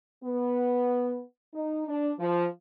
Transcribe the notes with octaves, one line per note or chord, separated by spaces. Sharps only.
B3
D#4
D4
F3